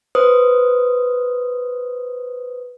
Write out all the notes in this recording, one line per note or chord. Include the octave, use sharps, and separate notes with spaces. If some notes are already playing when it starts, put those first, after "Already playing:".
B4 C5 D#6